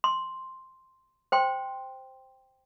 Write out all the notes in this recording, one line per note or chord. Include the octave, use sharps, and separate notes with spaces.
C6
C5 G5 C6